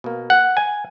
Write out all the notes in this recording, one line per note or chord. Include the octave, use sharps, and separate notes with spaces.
B2 A#3
F#5
G#5